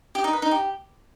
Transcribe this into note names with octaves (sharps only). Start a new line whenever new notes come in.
G4
D#4
B4
D#4
G4